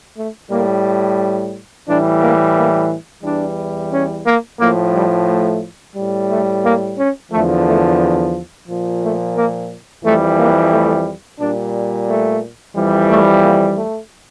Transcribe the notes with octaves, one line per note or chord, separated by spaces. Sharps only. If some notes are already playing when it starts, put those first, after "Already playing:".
A3
A2 G3 A#3
A2 E3 G3 D4
A#3
A#3
E2 E3 G3 D4
C#4
A#3
A2 F3 A#3
G3
A3
A2 G3
A3
A#3
C#4
E2 D3 F3 A3
A3
A#2 F3
A3
A#3
F2 E3 G3 A3
A#3
A3
A#2 G3 D4
A3
F2 E3 G3
A3
A#3
A3